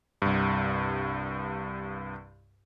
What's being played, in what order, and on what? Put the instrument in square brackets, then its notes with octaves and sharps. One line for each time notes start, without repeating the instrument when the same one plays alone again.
[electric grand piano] C2 G2